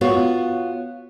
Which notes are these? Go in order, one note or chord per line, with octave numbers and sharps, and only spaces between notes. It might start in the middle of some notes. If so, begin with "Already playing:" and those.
B3 F4 F#4 C#5